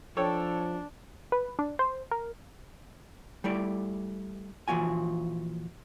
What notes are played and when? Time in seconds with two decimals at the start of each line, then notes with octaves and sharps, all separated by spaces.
0.17 F3 D4 A4 C#5 G5
1.32 B4
1.59 D4
1.79 C5
2.11 A#4
3.44 G3 A3 E4 D5
4.68 A#2 E3 F3 F#4 G#5